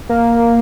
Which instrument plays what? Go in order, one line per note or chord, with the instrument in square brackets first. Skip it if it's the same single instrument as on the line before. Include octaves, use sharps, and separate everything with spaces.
[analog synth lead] A#3